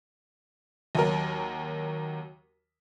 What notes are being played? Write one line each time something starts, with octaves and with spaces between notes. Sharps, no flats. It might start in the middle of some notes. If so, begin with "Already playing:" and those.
D#2 F#3 A#4